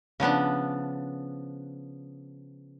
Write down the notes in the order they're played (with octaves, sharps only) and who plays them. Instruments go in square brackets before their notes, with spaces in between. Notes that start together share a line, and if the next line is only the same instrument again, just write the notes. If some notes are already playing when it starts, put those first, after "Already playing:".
[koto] C#3 F3 B3 D4